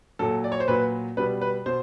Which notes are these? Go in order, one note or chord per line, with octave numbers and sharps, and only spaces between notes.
A#2 F#3 A4
D5
C#5
C5
A#2 F#3 B4
B2 G3 B4
B4
B2 C5